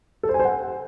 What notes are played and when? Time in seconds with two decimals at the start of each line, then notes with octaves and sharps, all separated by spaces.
0.23 A4
0.29 C5
0.34 G#5
0.40 C5
0.45 F#5